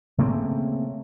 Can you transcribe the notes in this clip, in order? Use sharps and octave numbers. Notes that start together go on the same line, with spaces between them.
C#3 A3 A#3 C4